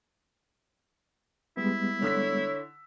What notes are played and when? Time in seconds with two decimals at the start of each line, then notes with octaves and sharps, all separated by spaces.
1.57 G3 G#3 B3 E4
2.02 D3 C#5 E6 B6